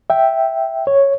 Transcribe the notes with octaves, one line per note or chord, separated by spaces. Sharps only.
E5 G5
C#5